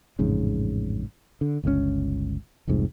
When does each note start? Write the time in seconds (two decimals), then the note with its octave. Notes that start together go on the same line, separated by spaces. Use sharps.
0.19 A1 F2 G#2 C#3
1.41 D3
1.63 G1 C#2 C3 C#4
2.68 F1 C2 F2 G#2